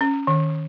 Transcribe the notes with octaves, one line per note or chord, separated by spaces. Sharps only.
C#4
D#3